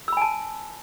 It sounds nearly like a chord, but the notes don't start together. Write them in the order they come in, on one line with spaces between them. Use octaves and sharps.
E6 B5 G#5 A5